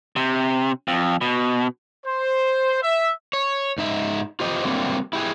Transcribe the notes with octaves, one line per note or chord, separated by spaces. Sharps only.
C3
F2
B2
C5
E5
C#5
G#2 D#4 E5
F4 G4 C5 D#5
D3 F#3 G3 A3 A#3 C4
E4 G4 G#4